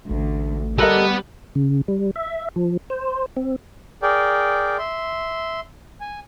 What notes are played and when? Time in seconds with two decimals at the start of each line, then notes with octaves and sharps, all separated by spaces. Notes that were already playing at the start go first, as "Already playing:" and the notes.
0.11 A1 D2
0.78 G3 B3 A4 A#4 D#5 F#5
1.55 C#3
1.88 G3
2.16 E5
2.56 F3
2.90 C5
3.36 C4
4.02 G#4 A#4 D5 G5
4.79 E5 C6
6.00 G#5